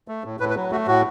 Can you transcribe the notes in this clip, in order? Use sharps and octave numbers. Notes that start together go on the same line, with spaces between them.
A3
A2
A2 B4
B4
F#3
A3 F#4
A2 F#4